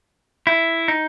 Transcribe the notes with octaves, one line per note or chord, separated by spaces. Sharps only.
E4
D#4